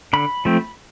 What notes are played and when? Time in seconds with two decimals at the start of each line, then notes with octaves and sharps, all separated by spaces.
0.13 D3 B5
0.45 F3 A3 C4